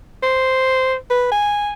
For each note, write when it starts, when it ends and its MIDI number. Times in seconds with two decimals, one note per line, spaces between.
0.23 0.95 72
1.10 1.29 71
1.32 1.73 80